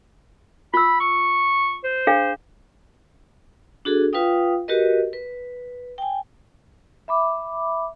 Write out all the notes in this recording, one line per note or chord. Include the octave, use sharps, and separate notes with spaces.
F4 B5 E6
C#6
C5
D4 G#4 F5
D4 F#4 G#4 A4
F4 B4 F5 G5 D#6
F#4 G4 A#4 B4 D#5
B4
G5 G#5
E5 B5 D6